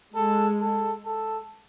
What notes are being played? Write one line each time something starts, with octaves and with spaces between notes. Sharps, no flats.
G#3 A4
A4
A4